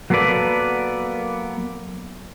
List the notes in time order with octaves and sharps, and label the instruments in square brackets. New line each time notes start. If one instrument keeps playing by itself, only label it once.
[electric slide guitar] F#3 A#3 B3 A4 B4 D5